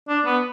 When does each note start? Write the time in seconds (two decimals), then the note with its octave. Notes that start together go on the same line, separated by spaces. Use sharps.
0.09 D4
0.25 B3